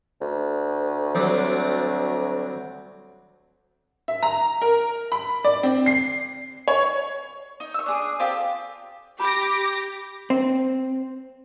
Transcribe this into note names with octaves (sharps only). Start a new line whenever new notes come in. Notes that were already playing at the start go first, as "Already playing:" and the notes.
D2
F#3 G3 C4
E5
A#5
A#4
B5
D5
C4
C7
C#5
D#4
C#6 E6
D4 G#4 D#6
C4 F4 G4 A4
G4 B5 D6 A#6
C4